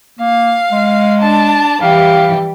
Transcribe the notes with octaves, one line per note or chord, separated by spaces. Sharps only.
A#3 F5
G#3
D4 A5
E3 G3 G4 F5